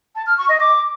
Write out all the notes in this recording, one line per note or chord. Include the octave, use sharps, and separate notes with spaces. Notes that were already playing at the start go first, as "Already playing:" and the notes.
A5
F6
C#6
D#5
D6